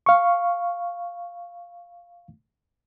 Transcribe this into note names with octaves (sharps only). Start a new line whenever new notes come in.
F5 C#6